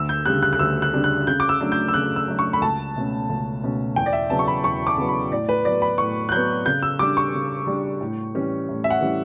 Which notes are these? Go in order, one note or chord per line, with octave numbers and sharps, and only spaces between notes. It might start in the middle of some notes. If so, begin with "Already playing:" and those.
Already playing: D2 E6
G6
C#3 G3 D4 F#6
F#6
F#6
D2 E6
F#6
C#3 G3 D4
F#6
C#3 G6
D6
E6
F#3 A3 D4
G6
E6
C#3 F#6
E6
F#3 A3 D4
C#6
B5
C#2 A5
B2 A3 C#4
C#2
B2 A3 C#4
E2 G5
D5
E5
C#3 F#3 B3 A5
C#6
B5
E2 C#6
D6
C#3 F#3 B3
B5
A2 D5
B4
F#3 B3 D5
B5
A2 C#6
F#6
F#3 B3 G6
C#3 G6
E6
G3 D4 D6
C#6
C#3
G3 D4
A2
E3 G3 C#4
A2
E5
F#5
E3 G3 C#4